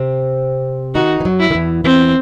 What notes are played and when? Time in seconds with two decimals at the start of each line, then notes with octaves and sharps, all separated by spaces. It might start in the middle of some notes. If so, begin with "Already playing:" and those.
Already playing: C3 C4
0.95 D#3 D#4 F#4
1.20 E3
1.25 F#2 F#3
1.40 E4
1.51 D#3
1.55 E2 E3
1.84 E2 E3 C4